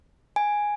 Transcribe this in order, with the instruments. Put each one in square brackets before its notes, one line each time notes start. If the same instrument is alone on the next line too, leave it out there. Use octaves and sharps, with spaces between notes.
[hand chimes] G#5